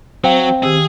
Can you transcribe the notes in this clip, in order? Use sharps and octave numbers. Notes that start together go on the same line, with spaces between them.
F#3 C4 F5 G5
D#3 G4 G#4 E6